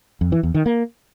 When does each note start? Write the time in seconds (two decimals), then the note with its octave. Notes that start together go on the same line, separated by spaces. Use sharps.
0.21 F2
0.32 E3
0.43 E2
0.54 D#3
0.66 A#3